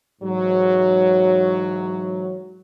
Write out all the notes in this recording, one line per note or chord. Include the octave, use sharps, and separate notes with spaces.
G#2 E3 F#3